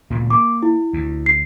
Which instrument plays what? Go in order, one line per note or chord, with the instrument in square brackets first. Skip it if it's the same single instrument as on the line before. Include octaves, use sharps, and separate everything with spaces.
[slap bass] E1 D2 A#2
[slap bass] A#3 [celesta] D6
[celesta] E4
[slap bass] D2
[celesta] C7